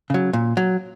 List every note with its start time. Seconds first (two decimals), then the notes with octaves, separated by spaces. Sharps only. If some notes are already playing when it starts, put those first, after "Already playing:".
0.10 C#3 F#3
0.33 A#2
0.57 F#3